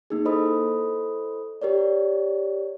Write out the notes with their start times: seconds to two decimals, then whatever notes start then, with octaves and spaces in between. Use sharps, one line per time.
0.10 A#3 D#4 G#4
0.25 E4 A4 C5 D#5 B5 D#6
1.62 G4 A#4 C#5 D5